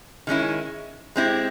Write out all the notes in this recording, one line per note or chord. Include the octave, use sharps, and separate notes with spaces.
D#3 G#3 C#4 E4
G#3 C4 E4 G4